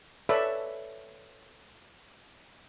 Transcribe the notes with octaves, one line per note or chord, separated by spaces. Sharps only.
A4 B4 C#5 D5 E5 B5